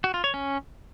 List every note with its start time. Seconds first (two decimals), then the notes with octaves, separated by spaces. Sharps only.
0.04 F#4
0.14 F4
0.24 C#5
0.34 C#4